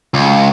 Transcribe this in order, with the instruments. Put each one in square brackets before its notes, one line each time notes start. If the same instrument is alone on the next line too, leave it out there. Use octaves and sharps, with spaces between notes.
[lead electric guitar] C#2